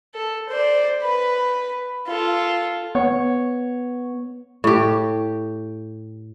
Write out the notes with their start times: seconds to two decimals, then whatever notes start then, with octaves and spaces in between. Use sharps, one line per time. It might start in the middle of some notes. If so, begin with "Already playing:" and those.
0.14 A4
0.49 C5 D5
1.03 B4 B5
2.07 F4 A4
2.95 B3 C#5
4.64 A2 G4